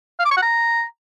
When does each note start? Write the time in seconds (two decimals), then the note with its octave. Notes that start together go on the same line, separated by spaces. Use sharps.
0.19 F5
0.25 D6
0.31 C#6
0.36 F#5
0.42 A#5